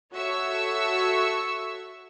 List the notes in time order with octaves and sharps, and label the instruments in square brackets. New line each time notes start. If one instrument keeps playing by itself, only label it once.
[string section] F#4 A4 C#5 E5 C#6 E6